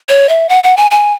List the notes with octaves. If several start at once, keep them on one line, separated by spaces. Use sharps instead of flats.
C#5
E5
F#5
F#5
G#5
G#5